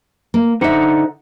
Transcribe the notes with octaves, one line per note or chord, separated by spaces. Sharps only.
A#3
D3 D#4 C5 E5 F#5